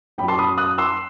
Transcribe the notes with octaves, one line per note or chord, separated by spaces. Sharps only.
F#2 F#3 G5 B5
A5 C6
B5 D#6
D#6 F#6
C6 E6